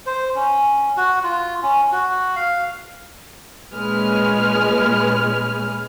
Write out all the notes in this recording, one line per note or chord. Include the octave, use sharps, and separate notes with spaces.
C5
C#4
F#4
F4
C#4
F#4
F5
A#2 G#3 C#4 B4 G#5 F6